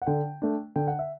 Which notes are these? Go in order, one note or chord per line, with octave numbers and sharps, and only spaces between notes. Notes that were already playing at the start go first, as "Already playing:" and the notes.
F#5
D3 G5
A3 D4
D3 G5
F#5
E5